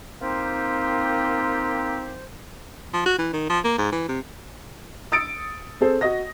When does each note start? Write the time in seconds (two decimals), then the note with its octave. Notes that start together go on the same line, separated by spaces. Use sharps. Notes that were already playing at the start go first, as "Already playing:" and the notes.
0.22 A#3 C4 D#4 F4 G4 C5
2.94 F3
3.06 F#4
3.19 E3
3.33 D#3
3.50 F3
3.65 A#3
3.78 G#2
3.92 E3
4.08 C3
5.12 D#6 E6 A6 C#7 D7
5.81 C4 G#4 A4 C5
6.01 F#4 D#5 D#6 A#6